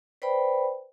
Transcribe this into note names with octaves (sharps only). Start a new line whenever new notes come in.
B4 C5 D5 G5 B5